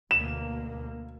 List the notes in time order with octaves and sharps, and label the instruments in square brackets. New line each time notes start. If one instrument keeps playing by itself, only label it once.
[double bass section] D2 B2 A#3 [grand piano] E7